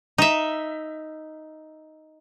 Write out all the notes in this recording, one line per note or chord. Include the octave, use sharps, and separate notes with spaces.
D#4 E5